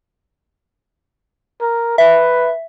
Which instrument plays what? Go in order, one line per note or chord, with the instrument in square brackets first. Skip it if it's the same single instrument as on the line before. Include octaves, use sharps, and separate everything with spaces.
[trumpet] A#4
[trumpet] B4 [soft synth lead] E5